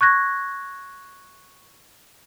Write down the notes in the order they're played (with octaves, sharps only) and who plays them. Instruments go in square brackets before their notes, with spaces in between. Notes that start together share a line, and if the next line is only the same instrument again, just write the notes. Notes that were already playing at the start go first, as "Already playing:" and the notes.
[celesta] C#6 F#6 G#6 A#6